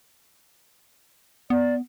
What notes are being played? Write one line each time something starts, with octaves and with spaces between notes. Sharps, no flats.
B3 D5